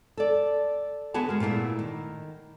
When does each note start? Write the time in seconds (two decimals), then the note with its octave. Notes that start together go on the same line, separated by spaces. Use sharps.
0.17 A4 D5
1.14 D3 B3 F#4 G#4 A5
1.29 G#3 A#4
1.40 A#2 A3 B3 E4
1.79 D#3